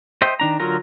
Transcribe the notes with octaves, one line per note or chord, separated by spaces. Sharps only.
C5 D#5 E5 G5
D#3 D4 A#5
D3 F#3 F4 A#4 A#5